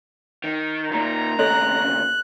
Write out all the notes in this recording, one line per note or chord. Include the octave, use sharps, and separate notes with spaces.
D#3
A#2 D#3 A#5
D#2 C#3 A4 C#5 D#5 F#6